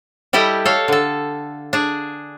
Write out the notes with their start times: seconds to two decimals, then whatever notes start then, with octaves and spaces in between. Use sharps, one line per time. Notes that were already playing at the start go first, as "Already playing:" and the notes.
0.33 G3 E4 G4 A4 D#5 G5
0.65 A4 C#5 F5
0.88 D3 A4
1.73 D4 G#4